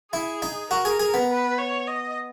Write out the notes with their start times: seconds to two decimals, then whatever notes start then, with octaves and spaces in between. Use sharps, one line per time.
0.13 E4 G#4
0.42 D#4
0.70 F#4 A#4
0.85 G#4
1.00 G#4
1.14 B3
1.30 B4
1.58 C#5
1.87 D#5